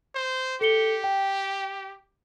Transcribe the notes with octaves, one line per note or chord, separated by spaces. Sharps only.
C5
G4 A4 C#7 G7
G5